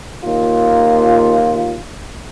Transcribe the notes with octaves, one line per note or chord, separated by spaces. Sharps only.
D#2 A#3 F4